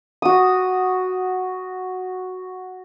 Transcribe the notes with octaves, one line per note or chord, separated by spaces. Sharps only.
F#4 D#6